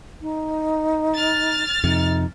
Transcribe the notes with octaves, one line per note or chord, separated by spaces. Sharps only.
D#4
F6 A6
F2 C3 D#4